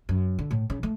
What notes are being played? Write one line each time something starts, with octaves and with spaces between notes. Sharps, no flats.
F#2
D3
A2
C#3
A3